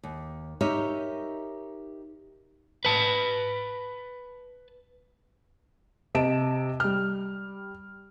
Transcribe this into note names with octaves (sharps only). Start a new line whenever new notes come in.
D#2
D#4 G4 A#4 C#5 D#5 E5
B4 A5
C3 D#5 A5 D7 E7
G3 F6